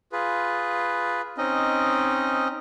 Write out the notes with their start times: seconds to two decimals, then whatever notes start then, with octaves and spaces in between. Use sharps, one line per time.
0.12 F4 G#4 B4
1.38 C4 C#4 D#4 D#5